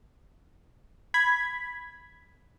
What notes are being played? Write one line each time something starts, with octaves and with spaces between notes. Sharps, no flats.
B5 G#6 B6